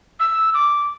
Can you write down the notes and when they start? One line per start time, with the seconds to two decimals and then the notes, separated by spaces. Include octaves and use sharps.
0.20 E6
0.54 D6